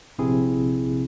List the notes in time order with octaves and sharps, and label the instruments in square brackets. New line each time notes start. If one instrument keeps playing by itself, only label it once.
[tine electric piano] A#1 C3 C4 E4 G#4